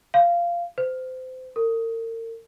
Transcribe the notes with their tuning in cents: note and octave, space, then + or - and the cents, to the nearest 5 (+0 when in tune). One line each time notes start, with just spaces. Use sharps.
F5 -15
C5 -25
A#4 -40